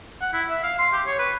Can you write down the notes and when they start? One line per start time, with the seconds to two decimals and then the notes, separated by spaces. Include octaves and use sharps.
0.21 F#5
0.33 E4
0.49 E5
0.63 F5
0.78 C6
0.93 G4
1.07 C#5
1.19 B4